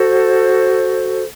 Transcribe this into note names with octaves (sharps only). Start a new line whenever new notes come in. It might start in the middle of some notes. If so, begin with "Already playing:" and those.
Already playing: F#4 A4 C5